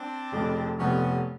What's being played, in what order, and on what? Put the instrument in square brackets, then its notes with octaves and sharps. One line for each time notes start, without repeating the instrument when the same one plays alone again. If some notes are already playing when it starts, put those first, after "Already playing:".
Already playing: [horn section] C4 D4
[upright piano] F1 F2 C#3
[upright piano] F1 F2 C3 [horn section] B3 C#4